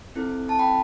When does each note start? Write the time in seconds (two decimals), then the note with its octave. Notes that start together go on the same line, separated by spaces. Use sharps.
0.15 C4 E4 A4
0.49 A5
0.59 G5 B5